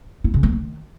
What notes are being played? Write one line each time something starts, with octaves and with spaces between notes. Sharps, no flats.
E4
C#3
A#3
D#3